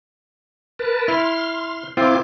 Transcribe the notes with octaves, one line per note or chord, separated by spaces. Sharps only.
A#4 B4 A5
E4 C6 F6
C4 E4 F4 C6 D6